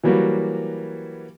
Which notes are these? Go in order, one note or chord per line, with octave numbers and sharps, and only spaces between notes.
E3 F#3 G3 A#3 F#4 B4